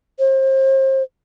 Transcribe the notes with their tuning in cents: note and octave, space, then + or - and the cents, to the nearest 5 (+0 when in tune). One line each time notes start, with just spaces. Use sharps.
C5 +35